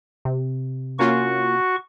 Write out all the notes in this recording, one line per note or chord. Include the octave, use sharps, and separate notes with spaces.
C3
A#3 C#4 F4 F#4 C#6